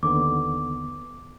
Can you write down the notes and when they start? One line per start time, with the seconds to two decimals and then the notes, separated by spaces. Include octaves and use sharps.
0.03 D#2 D3 B3 D6